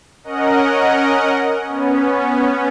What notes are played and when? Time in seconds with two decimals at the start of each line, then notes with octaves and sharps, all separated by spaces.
0.24 C#4 A#4 D#5 F#5
1.67 B3 C#4